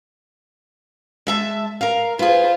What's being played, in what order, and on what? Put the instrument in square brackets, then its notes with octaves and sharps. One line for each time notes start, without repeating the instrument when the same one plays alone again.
[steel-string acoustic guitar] G#3 E5 A5
A#4 F5
[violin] F4 C5 [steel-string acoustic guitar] G#4 B4